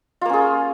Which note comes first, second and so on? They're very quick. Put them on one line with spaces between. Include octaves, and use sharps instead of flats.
F4 A#3 C#4 G#4